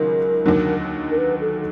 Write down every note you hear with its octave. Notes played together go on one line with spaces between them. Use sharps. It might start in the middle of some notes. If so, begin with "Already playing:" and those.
Already playing: C#2 D#3 F#3 A#4
D#2 D3 F#3
A#4
B4
A4